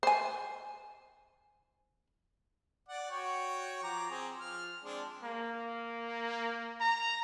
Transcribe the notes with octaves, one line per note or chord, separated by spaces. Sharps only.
C5 G#5
D5 F#5
F#4 C#5 G5
F3 A#5 D6
C4 G#4
F3 F6
G#3 C4 D4
A#3
A#5